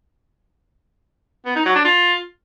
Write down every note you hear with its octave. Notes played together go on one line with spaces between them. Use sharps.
B3
D#4
F#3
D4
F4